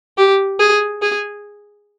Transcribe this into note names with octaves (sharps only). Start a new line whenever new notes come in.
G4
G#4
G#4